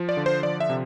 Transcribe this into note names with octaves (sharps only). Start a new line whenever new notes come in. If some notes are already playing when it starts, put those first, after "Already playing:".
Already playing: F3
D5
D3
C5
F3 D5
E5
C3